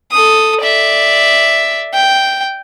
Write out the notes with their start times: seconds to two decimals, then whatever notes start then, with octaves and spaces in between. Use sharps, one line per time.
0.12 A4 D#6
0.62 D5 E5
1.94 G5